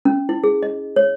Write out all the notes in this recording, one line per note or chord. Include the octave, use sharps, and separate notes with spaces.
C#4
E4
G#4
D#5
C#5